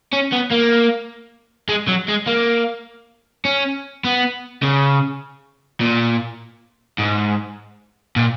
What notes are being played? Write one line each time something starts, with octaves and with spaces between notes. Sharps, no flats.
C#4
B3
A#3
G#3
F#3
G#3
A#3
C#4
B3
C#3
A#2
G#2
A#2